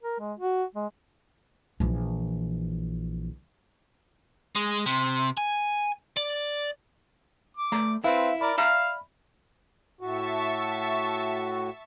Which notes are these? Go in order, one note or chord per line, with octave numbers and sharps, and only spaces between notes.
A#4
G#3
F#4
G#3
A#1 E3
G#3
C3
G#5
D5
D6
A3 D5 A#5
C4 E4 B4 E5 F5
A#4 D5 B5
D5 E5 F5 A#5 F6
A2 F#4 E5 A5 C#6